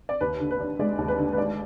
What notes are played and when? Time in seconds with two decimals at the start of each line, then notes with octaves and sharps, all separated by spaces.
0.09 D5
0.21 D#2 B4
0.40 D3
0.51 B4
0.60 D4
0.79 G#3 D5
0.98 D#2
1.08 B4
1.18 D3
1.33 B4
1.37 D4 D5